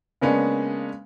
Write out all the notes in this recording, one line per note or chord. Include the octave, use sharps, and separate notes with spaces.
C#3 G#3 A#3 B3 C#4 D4